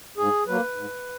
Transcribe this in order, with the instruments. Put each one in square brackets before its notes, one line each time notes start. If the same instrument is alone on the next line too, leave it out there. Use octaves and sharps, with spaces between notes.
[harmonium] G#2 G#4
F#3 A#3 B4
G#2